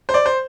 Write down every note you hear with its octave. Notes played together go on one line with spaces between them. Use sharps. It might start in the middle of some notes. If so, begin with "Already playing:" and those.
C5
D5
C5